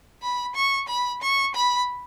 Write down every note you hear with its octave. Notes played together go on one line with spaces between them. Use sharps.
B5
C#6
B5
C#6
B5